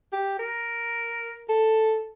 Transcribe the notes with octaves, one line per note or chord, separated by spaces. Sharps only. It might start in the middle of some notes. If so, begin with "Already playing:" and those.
G4
A#4
A4